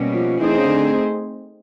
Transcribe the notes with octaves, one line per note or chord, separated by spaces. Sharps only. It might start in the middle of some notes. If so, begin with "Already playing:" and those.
Already playing: B2 G3 A#3 C#4
F3
E3 A3 C4 D#4 G#4 C5
C#3
D3